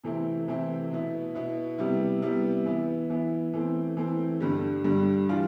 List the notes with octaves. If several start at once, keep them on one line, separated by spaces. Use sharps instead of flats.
C3 E3 A3 C4 E4
C3 E3 A3 C4 E4
B2 B3 E4
B2 B3 E4
C3 G3 B3 E4
C3 G3 B3 E4
E3 B3 E4
E3 B3 E4
E3 A3 C4
E3 A3 C4
G2 D3 G3
G2 D3 G3
E3 G3 D4 F4